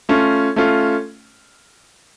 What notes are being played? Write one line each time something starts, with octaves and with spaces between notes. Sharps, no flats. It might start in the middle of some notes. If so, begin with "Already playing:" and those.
A3 C#4 F4
A3 C#4 F4